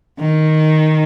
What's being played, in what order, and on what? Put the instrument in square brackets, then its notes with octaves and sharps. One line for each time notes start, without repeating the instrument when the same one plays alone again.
[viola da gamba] D#3